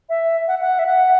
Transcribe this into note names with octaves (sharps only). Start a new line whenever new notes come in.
E5
F#5
F#5
E5
F#5